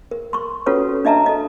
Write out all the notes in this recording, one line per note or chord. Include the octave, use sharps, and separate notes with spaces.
A#4
C6 C#6
C#4 F4 F#4 A4 B4 C#5
D4 D#5 E5 A5 A#5
A4 D#5